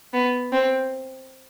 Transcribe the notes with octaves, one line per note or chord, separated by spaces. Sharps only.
B3
C4